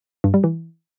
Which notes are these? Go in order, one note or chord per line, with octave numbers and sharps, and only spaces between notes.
G2
G3
E3